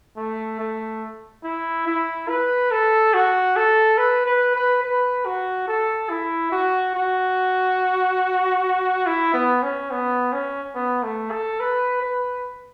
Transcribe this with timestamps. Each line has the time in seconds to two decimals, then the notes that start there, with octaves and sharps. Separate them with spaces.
0.17 A3
0.60 A3
1.44 E4
1.87 E4
2.29 B4
2.71 A4
3.14 F#4
3.56 A4
3.98 B4
4.26 B4
4.55 B4
4.84 B4
5.26 F#4
5.68 A4
6.10 E4
6.52 F#4
6.95 F#4
9.06 E4
9.34 B3
9.63 C#4
9.91 B3
10.33 C#4
10.75 B3
11.04 A3
11.32 A4
11.60 B4
12.03 B4